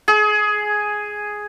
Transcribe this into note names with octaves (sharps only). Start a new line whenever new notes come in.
G#4